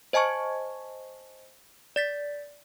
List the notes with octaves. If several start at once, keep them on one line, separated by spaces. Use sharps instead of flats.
C5 D#5 G#5 A5 C#6 G#6
D5 A6 B6